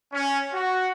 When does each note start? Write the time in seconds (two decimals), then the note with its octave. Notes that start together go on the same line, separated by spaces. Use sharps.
0.13 C#4
0.53 F#4